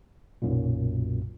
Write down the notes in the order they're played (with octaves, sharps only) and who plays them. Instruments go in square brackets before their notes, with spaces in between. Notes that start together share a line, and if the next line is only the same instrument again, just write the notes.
[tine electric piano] B1 F#2 A#2